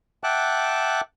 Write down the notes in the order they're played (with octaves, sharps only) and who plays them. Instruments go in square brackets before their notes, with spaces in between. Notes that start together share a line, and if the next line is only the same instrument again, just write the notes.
[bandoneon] E5 F#5 G5 A5 D6 F#6